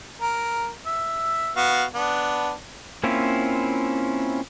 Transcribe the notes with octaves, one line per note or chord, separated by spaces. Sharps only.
A#4
E5
B3 F#4 F5
B3 D4
A#3 C4 C#4 E4 F4